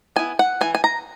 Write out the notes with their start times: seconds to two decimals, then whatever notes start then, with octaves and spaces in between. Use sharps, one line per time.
0.16 B3 E4 G#5
0.39 F#5
0.61 E3 G#5
0.75 G#5
0.84 A#5